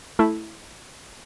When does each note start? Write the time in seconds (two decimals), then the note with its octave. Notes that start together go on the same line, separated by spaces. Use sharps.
0.19 A3 E4